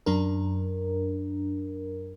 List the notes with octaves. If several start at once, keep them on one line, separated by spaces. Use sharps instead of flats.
F#2 D4 A#4